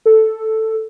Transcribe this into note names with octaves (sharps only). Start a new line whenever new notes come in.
A4